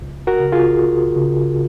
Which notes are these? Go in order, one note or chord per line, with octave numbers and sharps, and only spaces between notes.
C#2
F#4 A#4
C#3
F4 G#4
C#2
C#3